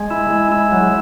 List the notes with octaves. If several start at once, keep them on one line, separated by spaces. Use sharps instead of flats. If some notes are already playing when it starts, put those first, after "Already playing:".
Already playing: G#3
E4
G#3
E4
F#3